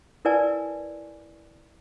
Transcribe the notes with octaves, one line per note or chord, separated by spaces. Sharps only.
E4 A#4 B4 D5 G#5 A5